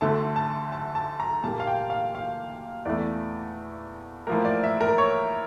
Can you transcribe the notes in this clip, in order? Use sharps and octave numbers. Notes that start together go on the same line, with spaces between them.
D2 D3 A3 A5
A5
A5
A5
A#5
A#2 G3 A#3 A5
F5
G5
F5
F5
E2 E3 A3 D5
A2 F3 A#3 A#4
D5
E5
A#4
C#5